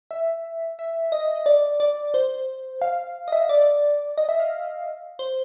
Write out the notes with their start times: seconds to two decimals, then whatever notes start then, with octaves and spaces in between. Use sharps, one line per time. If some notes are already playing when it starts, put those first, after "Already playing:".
0.11 E5
0.79 E5
1.12 D#5
1.46 D5
1.80 D5
2.14 C5
2.82 F5
3.28 D#5
3.32 E5
3.49 D5
4.17 D#5
4.29 E5
4.40 F5
5.19 C5